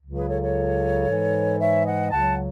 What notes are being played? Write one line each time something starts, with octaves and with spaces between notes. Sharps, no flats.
C#2 C#3 F#3
G#4 B4
A4 C#5
A4 C#5
G#2 E3 G#3
C#5 E5
D#5 F#5
C#2 C#3 F#3 F#5 A5